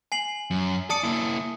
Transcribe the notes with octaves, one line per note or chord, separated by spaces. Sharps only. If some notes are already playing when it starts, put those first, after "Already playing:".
G#5 C7 F#7
F#2
D5 A5 D#6 C#7
A#3 E4